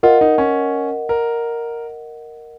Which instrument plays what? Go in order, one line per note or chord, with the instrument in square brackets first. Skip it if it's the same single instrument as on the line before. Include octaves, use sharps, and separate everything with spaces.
[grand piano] F4 [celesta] A#4 D#5 F#5
[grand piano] D#4
C#4
A#4